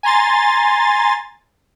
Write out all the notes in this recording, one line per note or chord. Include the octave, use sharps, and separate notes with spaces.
G#5 A#5 C6 A6